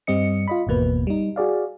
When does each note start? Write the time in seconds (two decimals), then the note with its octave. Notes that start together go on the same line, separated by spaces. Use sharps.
0.07 G2 G3 C4 D#5 C#7
0.48 F4 D#5 B5
0.67 G#1 E2 B2 A#3 B4
1.07 G3 D#4
1.36 F#4 G#4 D5 F5